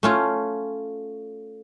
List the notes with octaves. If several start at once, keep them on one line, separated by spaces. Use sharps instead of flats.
A3 C#4 F4